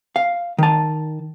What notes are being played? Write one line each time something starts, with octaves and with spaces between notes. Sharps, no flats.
F5
D#3 A5